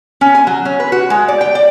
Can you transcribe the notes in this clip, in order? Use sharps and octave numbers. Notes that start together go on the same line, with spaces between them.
C#4
G#5
F#3
C#4
B4
F#4
G#3
D5
G5
D5